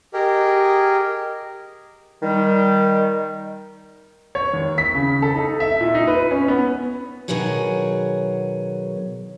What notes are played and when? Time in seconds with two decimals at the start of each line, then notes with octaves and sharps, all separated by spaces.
0.14 G4 G#4 A#4 D#5
2.23 D#3 G3
4.35 C#5
4.53 D#2
4.78 B6
4.94 C#3
5.22 A4
5.35 D#4
5.60 E5
5.81 A#2
5.95 D#4
6.07 B4
6.31 C#4
6.48 B3
7.28 B2 D#3 F#3 G#4 C#5